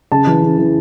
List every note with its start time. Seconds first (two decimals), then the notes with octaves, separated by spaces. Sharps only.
0.12 C#3 A5
0.27 E3
0.43 C#3
0.58 E3